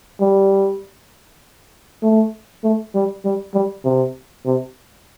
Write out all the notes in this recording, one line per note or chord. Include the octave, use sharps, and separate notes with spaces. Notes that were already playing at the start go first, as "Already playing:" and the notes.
G3
A3
A3
G3
G3
G3
C3
C3